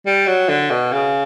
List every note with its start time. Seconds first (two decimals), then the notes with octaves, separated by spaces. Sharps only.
0.06 G3
0.27 F#3
0.49 D3
0.70 B2
0.92 C#3